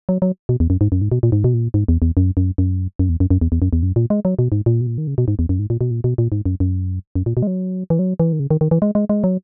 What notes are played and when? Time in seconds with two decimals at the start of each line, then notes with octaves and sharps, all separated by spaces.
0.09 F#3
0.22 F#3
0.49 B2
0.60 E2
0.70 F#2
0.81 G#2
0.92 F#2
1.01 G#2
1.12 B2
1.23 A#2
1.32 G#2
1.44 B2
1.54 A#2
1.74 G#2
1.88 E2
2.02 E2
2.17 F#2
2.37 F#2
2.58 F#2
2.99 F#2
3.09 E2
3.20 F#2
3.31 F#2
3.41 E2
3.52 E2
3.62 F#2
3.73 E2
3.83 F#2
3.96 A#2
4.10 G#3
4.25 F#3
4.39 B2
4.52 G#2
4.66 A#2
4.81 B2
4.87 A#2
4.98 D#3
5.07 C#3
5.18 B2
5.28 G#2
5.39 E2
5.49 F#2
5.59 G#2
5.70 A#2
5.81 B2
5.91 A#2
6.04 B2
6.18 A#2
6.32 G#2
6.46 F#2
6.60 F#2
7.15 F#2
7.26 A#2
7.37 B2
7.42 G#3
7.47 F#3
7.90 E3
7.99 F#3
8.20 E3
8.33 D#3
8.40 C#3
8.51 D#3
8.61 D#3
8.71 E3
8.82 G#3
8.95 G#3
9.09 G#3
9.24 F#3